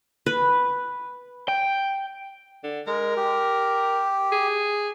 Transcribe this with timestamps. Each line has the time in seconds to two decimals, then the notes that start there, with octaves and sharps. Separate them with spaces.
0.26 B4
1.48 G5
2.64 D3
2.87 G#3 A#4
3.17 G4
4.32 G#4